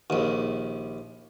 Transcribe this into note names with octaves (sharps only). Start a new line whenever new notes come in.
A#1 D#2